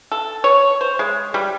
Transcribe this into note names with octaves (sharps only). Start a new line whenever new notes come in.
A4
C#5
C5
G#3
G3